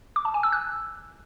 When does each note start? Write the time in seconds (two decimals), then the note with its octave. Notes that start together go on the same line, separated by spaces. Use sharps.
0.16 D6
0.25 A5
0.34 G#5
0.43 E6
0.52 F#6